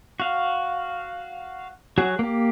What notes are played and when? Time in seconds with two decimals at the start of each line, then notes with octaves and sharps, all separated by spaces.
0.20 F#4 F5
1.98 F#3 F#4 G#4
2.19 A#3 G4